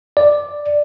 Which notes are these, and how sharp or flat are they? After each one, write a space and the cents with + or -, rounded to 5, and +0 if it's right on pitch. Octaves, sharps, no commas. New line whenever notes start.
D5 +5